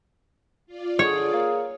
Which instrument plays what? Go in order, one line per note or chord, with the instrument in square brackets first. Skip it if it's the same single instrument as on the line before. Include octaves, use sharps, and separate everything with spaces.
[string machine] F4 D5
[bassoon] D3 [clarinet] G#4 [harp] C#5
[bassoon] A#3